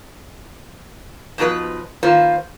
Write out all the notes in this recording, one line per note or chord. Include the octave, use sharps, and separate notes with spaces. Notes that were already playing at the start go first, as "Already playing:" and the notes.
G#2 B2 F3 B4 D#5
D#3 A#3 F4 B4 C5